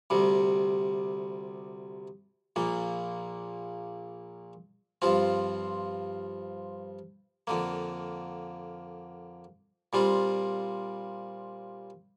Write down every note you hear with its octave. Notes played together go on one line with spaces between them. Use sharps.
D2 C3 G3
A#1 A#2 A#3
G2 F3 C4 F4
F2 D3 A#3
A#2 G3 C4 F4